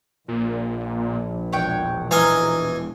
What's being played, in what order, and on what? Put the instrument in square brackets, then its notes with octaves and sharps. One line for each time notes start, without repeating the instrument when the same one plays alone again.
[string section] A#1 [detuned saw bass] A#2
[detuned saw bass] E1 [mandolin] C#5 F#5 G5
[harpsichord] E3 D#5 G#5 [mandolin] A#5 C6 F6